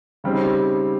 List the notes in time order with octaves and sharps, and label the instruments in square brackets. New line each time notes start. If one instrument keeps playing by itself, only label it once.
[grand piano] C#3 G3 C4 D#4